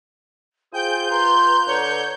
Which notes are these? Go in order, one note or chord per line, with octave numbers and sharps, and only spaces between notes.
F4 G#4 C5 G5 G#5 G6
B4 A#5 C6
D3 C#5